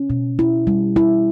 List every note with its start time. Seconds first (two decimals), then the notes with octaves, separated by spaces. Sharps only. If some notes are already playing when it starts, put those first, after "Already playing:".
Already playing: C#4
0.10 B2
0.39 E4
0.67 G3
0.96 E4